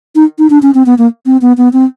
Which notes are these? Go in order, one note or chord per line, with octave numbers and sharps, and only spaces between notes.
D#4
D#4
D4
C#4
C4
B3
A#3
C4
B3
B3
C4